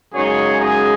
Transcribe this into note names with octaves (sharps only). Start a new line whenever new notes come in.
F#2 C#3 G#3 D#4 G#4 C#5
D#4 G#4